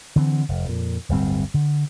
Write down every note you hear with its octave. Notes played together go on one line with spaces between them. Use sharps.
D3 E3 C4
F1
F2 A#2
D1 G1 G3 C4
D3